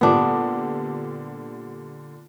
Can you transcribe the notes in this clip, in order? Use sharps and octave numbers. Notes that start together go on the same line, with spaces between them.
A#2 D3 G3 B3 D4